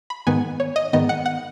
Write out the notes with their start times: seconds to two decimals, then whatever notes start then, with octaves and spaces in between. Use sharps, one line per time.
0.10 B5
0.27 G#2 D#3 B3 G#5
0.60 C#5
0.76 D#5
0.93 G#2 D#3 B3 D#5
1.09 F#5
1.26 F#5